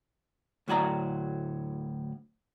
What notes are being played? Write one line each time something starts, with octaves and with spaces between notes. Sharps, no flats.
D2 A2 F#3 D5 A#5